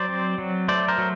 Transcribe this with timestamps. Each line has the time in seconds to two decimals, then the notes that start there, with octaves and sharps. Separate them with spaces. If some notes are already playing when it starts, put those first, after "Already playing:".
Already playing: F#3 C5 D5
0.09 C4
0.38 F#3
0.68 A3 C5 D5
0.88 A#4 C5
0.98 F#3